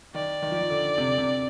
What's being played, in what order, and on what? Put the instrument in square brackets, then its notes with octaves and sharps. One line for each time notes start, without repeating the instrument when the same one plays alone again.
[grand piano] D#3 [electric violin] D5
[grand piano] D#3
F3
D#3
D3
C3
C3